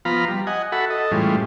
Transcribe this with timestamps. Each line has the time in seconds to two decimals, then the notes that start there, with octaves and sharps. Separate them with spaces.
0.05 F3 B3 F4 F5 A#5 B5
0.28 G3
0.47 D#5 F#5 G#5
0.72 F#4 A4 E5 F#5 B5
0.90 A4 D#5
1.11 A2 E3 G3 G#3 C#4 F4